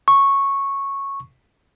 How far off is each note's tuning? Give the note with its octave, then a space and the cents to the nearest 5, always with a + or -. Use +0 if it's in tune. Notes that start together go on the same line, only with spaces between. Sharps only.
C#6 -10